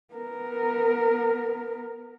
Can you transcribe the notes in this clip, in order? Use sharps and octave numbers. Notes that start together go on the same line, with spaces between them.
B3 A#4